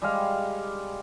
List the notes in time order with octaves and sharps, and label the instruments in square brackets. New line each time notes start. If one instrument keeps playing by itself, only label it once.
[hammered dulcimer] G3 G#3 F5